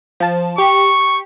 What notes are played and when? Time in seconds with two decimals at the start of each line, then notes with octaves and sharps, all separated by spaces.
0.20 F3 A5
0.58 G4 C#6